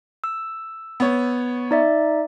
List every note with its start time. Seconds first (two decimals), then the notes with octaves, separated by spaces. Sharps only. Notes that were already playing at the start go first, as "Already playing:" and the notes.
0.24 E6
1.00 B3 C#5
1.71 D#4 D5 E5